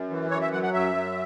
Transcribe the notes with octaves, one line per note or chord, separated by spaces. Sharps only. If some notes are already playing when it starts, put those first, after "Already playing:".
Already playing: F#2
E3
F#2 C#5
E5
F#3 F#5
F#5
F#2 E5
F#3